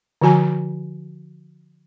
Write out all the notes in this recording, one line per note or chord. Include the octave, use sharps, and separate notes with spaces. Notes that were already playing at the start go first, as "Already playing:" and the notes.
D3 F3 F#4 G#5 A#5